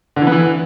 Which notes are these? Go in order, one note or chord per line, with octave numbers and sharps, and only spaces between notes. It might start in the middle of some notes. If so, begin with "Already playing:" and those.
D3
E3
B3
E3